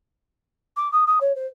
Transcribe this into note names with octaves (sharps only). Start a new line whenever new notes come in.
D6
D#6
D#6
C#5
C5